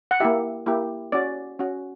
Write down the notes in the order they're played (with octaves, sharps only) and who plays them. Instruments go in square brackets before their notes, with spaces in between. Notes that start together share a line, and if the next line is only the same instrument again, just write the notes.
[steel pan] F#5
A#3 E4 G4 E5
A#3 E4 G4
C#4 F#4 D5
C#4 F#4